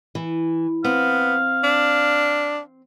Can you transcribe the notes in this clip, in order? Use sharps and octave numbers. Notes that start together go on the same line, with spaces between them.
E3
B3 C4 F5
D4